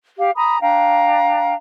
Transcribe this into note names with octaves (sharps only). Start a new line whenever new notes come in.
G4 F5
G#5 A#5 B5 D#6
D4 F5 G5 A#5